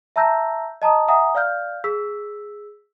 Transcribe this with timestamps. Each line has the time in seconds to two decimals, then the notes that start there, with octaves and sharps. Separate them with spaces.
0.16 E5 A5 A#5 E6 G6 A#6
0.82 D#5 A5 A#5 D#6
1.08 E5 F#5 G#5 A#5 D#6
1.35 D5 F5 F6 G6
1.84 G#4 E6 B6